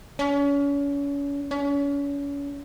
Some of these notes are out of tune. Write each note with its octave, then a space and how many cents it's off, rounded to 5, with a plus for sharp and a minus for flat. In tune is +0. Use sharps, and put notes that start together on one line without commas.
C#4 +35
C#4 +35